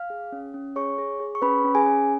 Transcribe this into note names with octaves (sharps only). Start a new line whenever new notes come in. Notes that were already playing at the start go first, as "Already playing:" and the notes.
Already playing: F5 F6
G#4
C#4
C#4
G#4 C#5 C#6
G#4
G#4
C#6
C#4 B4 B5
C#4
G#4 G#5
C#4